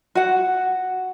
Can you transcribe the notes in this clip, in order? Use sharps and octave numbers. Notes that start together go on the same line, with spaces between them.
F#4 F#5